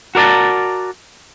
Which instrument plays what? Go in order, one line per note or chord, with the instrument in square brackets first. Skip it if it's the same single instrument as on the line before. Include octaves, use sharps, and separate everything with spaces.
[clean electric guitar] F#4 A#4 D5 A5 A#5